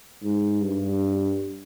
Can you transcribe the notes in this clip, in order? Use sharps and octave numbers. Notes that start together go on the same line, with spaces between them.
G#2
G2